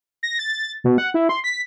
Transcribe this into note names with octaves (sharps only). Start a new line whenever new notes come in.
A#6
A6
B2
F#5
E4
C6
B6